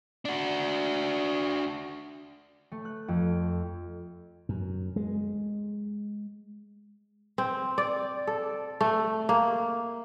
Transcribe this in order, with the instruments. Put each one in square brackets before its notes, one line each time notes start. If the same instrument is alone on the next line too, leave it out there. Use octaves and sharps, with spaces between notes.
[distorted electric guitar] D4 F#4
[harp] A3
F#6
F2
[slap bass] F#2
G#3
[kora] C4
D5
A4
A3
A#3